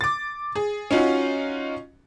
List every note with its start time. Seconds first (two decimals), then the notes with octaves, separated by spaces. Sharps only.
0.01 D6 A6
0.56 G#4
0.91 C#4 D#4 F4 F#4